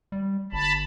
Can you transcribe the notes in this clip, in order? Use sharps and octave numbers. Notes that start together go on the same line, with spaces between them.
G3
G1 A5 B5